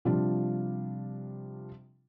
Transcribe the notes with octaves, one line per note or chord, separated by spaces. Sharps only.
C3 F3 G3 D4 F4